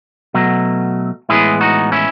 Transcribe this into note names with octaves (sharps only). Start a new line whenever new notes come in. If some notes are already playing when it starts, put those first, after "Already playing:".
B2 F#3 A3
A2 E3 G#3 B3 E4 G#4
D#4 F#4
C#4 E4